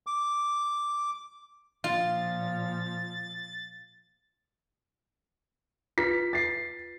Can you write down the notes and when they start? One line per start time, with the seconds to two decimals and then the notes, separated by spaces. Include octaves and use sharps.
0.07 D6
1.84 A#2 F3 F4 A6
5.98 F4 B4 B6
6.33 A6 C7